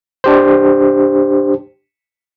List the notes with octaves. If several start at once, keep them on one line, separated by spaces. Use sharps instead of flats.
D4 G4 C5